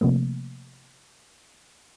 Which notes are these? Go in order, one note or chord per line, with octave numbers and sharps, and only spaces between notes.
C3 F3 A3 A#3